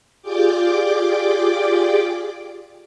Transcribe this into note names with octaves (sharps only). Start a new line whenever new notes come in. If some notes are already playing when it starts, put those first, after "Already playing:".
F4 G4 G#4 D5 G5 D6